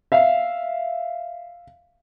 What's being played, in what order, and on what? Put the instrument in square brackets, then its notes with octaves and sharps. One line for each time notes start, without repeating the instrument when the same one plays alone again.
[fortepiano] E5 F5